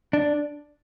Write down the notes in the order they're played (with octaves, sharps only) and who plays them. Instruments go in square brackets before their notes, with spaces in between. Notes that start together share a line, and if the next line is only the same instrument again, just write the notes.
[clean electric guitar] D4